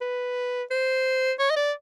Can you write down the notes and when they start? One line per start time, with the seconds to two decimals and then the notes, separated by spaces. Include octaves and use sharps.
0.01 B4
0.71 C5
1.39 C#5
1.50 D#5
1.57 D5